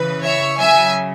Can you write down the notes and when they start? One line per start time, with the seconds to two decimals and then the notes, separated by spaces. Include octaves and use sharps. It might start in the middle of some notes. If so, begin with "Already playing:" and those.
Already playing: C#3 E3 B4
0.23 C#5 E5
0.58 C#3 F#3 E5 G#5